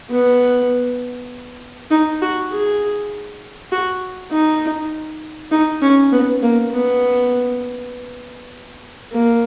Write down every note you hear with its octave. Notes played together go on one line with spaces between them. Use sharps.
B3
D#4
F#4
G#4
F#4
D#4
D#4
C#4
B3
A#3
B3
A#3